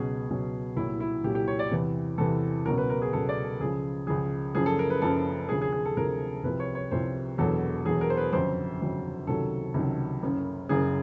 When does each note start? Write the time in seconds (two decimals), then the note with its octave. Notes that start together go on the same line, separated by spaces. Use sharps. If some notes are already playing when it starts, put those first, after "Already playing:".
Already playing: C#2 B2 F#3 G#4
0.29 C#2 B2 F#3
0.76 C2 A#2 F#3 E4
1.00 E4
1.24 C2 A#2 F#3 G4
1.35 G4
1.48 C#5
1.59 D5
1.71 E2 C3 E3
2.18 E2 C3 E3 A4
2.65 C#2 B2 F#3 A#4
2.78 B4
2.90 A#4
3.02 G#4
3.13 C#2 B2 F#3 A4
3.29 D5
3.45 A4
3.60 C#2 C#3 F3 G#4
4.07 C#2 C#3 F3 G#4
4.55 F#1 F#2 C#3 F3 G#4
4.66 A4
4.79 A#4
4.90 B4
5.02 F#1 F#2 C#3 F3 A4
5.49 D2 C3 F3 G#4
5.62 G#4
5.73 G#4
5.85 A4
5.97 D2 C3 F3 A#4
6.43 C2 C3 F3 B4
6.60 C#5
6.75 C#5
6.91 C2 C3 F3 C5
7.38 E1 E2 B2 F#3 A4
7.86 E1 E2 B2 F#3 G#4
8.01 A#4
8.10 C5
8.17 B4
8.33 G1 F2 C#3 F#3 C5
8.81 G1 F2 C#3 F#3
9.27 C#2 C3 D#3 F#3 A4
9.74 C#2 C3 D#3 F#3
10.23 F#1 F#2 C#3
10.69 F#1 F#2 C#3 G#4